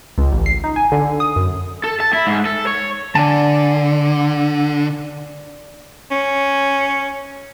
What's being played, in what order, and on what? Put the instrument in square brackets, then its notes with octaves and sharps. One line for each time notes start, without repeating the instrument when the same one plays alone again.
[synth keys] C#2
A1
C7
D#4
G#5
D3
D#6
F#2
[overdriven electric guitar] A4
A5
E4
G#2
A4
C#5
[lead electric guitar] D3 [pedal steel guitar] D5 G#5 A5
[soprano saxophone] C#4